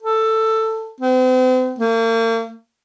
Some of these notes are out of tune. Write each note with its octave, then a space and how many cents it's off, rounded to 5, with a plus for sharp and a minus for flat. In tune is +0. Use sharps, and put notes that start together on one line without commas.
A4 +10
C4 -40
A#3 -40